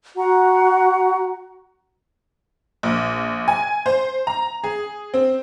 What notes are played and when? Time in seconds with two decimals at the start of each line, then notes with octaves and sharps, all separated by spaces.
0.17 F#4 F#5 A#5
2.83 A#1
3.48 G#5
3.86 C5
4.27 A#5
4.64 G#4
5.14 C4